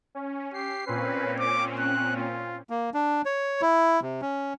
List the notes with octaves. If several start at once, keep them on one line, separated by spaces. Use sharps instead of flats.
C#4
G4 C7
A#2 C4 C#4 B4
D6
F#6
F4
A#3
D4
C#5
E4
C3
C#4